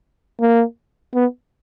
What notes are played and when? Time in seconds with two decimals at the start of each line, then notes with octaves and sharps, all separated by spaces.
0.41 A#3
1.14 B3